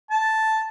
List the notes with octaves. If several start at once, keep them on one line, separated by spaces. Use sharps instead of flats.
A5